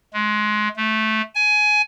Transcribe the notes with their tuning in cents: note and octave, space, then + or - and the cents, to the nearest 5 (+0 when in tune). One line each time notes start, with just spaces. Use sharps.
G#3 +25
A3 -10
G#5 +15